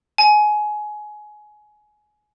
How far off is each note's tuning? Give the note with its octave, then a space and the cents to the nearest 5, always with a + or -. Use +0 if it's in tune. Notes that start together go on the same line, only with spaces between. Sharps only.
G#5 +20